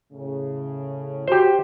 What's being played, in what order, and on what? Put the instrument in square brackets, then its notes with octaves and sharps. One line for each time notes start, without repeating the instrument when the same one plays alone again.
[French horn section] A2 C#3
[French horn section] F#4 [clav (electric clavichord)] G4 C5